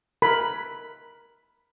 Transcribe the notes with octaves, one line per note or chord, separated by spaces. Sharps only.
A#4 B5